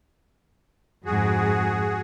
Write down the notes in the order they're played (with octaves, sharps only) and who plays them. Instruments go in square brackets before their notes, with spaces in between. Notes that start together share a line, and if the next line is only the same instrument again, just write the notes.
[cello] F2 G#2 [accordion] F#4 G#4